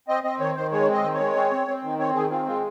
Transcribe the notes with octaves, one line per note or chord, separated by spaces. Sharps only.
C4 D#5
C4 D#5
D#3 C#5
D#3 C5
G#3 C#5
C4
D#5
D#3
C#5
G#3
C4
C4
C4
D#3
C4 C#5
D#3 G#4
C4 F4
G#3 F4